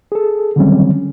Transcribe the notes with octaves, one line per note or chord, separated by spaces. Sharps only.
G#4 A4
D3 D#3 F#3 G3 C4 C#4